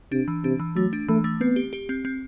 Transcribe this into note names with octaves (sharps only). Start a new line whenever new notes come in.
C3 D4
E3
C3 D4
E3
F#3 A3
D4
E3 A3
A3
B3 C4
G4
G4
C4
C4